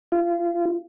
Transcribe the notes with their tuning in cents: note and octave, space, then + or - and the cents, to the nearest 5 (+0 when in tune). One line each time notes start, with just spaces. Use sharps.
F4 -30